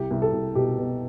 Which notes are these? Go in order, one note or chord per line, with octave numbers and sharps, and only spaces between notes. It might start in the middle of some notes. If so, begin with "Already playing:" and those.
Already playing: C2 G4
C2
A4
C2
B2 G4
B2